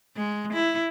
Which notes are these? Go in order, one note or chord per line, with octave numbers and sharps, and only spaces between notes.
G#3
E4